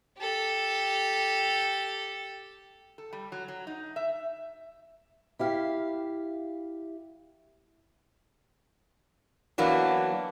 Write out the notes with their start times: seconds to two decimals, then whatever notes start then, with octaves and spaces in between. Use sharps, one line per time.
0.18 G4 A4
2.98 A4
3.13 G3
3.32 F#3
3.48 F#3
3.67 D#4
3.96 E5
5.39 E4 G4 F5
9.58 E3 F#3 A#3 B3 D4